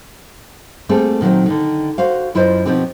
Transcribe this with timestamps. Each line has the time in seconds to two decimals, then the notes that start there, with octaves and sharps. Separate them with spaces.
0.89 G3 A3 A#3 C4 G#4 A4
1.21 A#2 D#3 F#3 C4
1.46 D3 D#3
1.98 F#4 C5 F5
2.35 F#2 E4 F4 C5 D#5
2.65 B2 F3 C4 D#4 G4